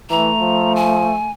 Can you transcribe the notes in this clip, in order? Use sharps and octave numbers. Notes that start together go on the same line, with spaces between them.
E3 A3 A#5
F3
G#5